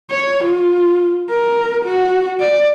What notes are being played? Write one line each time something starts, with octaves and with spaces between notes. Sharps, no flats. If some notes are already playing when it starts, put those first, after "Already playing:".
C#5
F4
A#4
F#4
D5